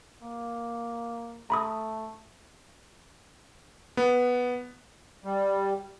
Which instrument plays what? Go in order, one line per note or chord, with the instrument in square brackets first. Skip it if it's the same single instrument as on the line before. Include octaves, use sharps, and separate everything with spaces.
[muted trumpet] A#3
[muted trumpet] A3 [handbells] A#5 B5 D#6
[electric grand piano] B3
[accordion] G3